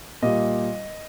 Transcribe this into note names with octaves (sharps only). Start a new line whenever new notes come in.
A#2 G3 D#5